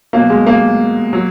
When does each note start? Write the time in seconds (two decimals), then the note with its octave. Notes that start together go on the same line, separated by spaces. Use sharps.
0.13 B2 F#3 A#3
0.30 G#3
0.47 A#3
1.13 F#3